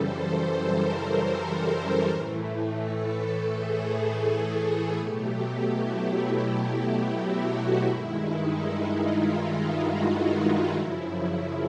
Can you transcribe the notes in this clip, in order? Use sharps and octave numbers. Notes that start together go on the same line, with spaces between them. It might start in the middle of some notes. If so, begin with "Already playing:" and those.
Already playing: F#2 C#3 E3 G3 A4 C5
A#4
A2 E3 A3
A4
G#4
B2 F#3 A3 G4
E4
F#4
G2 D#3 G#3 E4
D#4
E4
F4
E4
F#4
E4
F#2 C#3 F3